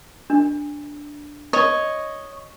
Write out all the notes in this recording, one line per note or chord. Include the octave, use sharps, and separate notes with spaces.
D4
C#5 D#5